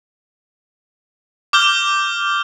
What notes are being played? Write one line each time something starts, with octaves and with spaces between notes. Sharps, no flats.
D6 F6 G6 G7